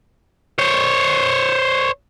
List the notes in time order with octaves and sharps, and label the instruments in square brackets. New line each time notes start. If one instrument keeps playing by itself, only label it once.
[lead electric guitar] C5 C#5